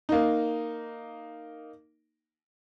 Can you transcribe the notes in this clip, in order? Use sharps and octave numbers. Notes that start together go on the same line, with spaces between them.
A#3 D#4